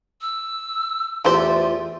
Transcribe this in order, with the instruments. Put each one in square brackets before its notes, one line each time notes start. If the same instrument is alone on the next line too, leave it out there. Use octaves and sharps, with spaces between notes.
[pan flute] E6
[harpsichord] E2 G4 D5 [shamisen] E3 A3 C5 [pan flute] F4